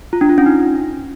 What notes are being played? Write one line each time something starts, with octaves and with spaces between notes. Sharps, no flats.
F4
D4
F4
C#4
D#4